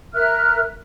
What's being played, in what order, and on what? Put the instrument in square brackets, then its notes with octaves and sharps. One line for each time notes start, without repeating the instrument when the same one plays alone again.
[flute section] A#4 E5 F6 F#6